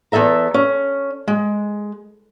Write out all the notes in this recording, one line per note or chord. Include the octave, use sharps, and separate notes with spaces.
E2 G#3 A4 E5 A#5
C#4
G#3